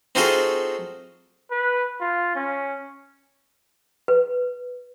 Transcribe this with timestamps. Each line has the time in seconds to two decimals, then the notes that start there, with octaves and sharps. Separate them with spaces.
0.15 C4 D#4 F4 F#4 G#4 A4
1.51 B4
2.01 F4
2.36 C#4
4.08 B4